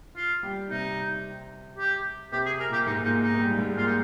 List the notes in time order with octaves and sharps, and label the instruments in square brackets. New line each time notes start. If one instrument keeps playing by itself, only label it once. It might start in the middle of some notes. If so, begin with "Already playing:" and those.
[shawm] F4
[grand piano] G3 G4
[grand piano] C3 C4 [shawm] D#4
[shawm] G4
[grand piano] C3 C4 [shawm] G4
[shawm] G#4
A#4
[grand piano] A#2 A#3 [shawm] G4
[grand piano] G#2 G#3 [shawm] D#4
[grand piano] A#2 A#3 [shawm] D#4
[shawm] D#4
[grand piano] G#3
G3
G#2 G#3
[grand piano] A#2 A#3 [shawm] F4
[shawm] D#4